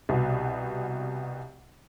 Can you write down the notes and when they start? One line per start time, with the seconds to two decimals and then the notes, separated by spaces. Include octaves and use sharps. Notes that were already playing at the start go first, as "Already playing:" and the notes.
0.09 C2 B2